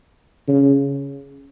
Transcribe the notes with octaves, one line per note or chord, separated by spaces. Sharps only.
C#3